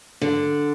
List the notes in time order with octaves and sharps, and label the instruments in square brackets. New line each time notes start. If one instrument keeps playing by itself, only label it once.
[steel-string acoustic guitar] D3